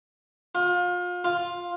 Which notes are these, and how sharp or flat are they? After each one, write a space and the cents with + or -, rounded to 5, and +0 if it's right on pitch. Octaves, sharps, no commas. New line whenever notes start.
F4 +30
F4 +5